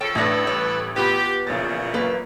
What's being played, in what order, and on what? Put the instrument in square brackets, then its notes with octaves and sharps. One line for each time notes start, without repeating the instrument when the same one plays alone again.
[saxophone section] C#3 F3 A4 [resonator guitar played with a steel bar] C#5 G5
[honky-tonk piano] A1 A#6 [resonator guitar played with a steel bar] A3 D4 D5 [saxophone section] A4 B4
[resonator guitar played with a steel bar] G3 G4 C#5
[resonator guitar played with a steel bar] B3 F4 B4 [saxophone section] G4
[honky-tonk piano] A#1 A6 [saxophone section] E2 A#2 C#3
[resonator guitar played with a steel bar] F#3 A#3 B4